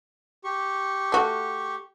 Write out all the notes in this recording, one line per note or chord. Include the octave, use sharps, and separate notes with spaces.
G4 C#6
A3 F#4